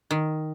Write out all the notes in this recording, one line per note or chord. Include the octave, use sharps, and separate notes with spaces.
D#3